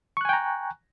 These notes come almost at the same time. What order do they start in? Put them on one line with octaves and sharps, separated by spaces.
C#6 F#6 G#5 G5 A#5